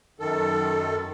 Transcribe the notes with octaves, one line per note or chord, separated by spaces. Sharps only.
F#2 D#3 A4